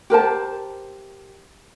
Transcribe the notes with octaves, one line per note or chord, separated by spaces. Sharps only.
G4 A#4 C5 A5